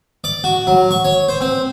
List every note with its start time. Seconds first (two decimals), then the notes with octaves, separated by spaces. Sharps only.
0.24 D5
0.44 F#4
0.67 F#3
0.91 C#6
1.05 C#5
1.28 C5
1.41 C4